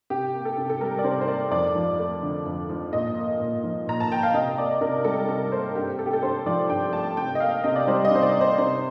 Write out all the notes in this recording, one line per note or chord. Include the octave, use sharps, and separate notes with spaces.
C3 G4
A#3
A4
C3
A4
G3 A#4
D5
C3 C5
C5
A#3 D5
F2 D5
F3
A3
D3
F2
F3
A#2 D#5
A#3
A#2
F3
A#2 A#5
A5
A#3 G5
F5
C3 D#5
A#3 D5
C3 A#4
G3 A4
C3 A#4
A#3 C5
G2 G4
A3 A4
G4
A4
G2 C5
F3 D5
G2 G5
A3 A5
C3 G5
D#5
A#3 F5
C3 D#5
D5
G3 C5
D#5
C3 C5
D5
A#3
C5
C3 C5